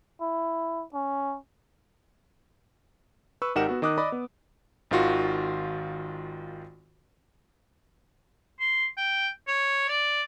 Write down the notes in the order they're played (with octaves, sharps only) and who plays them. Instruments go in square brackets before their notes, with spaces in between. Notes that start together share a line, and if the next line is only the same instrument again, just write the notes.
[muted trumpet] E4
C#4
[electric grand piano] B4 C#6 E6
G#1 D#4 G4 A#4 F#5 E7
B3 F#4
D#3 D#5 D6 D#6 F#6
D5 D#5 B5 D6
B3
G#1 D#3 F4 F#4
[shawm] C6
G5
C#5
D5